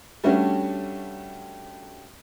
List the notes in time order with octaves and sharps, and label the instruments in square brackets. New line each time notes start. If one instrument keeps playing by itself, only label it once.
[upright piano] G3 A3 C#4 D4 F#4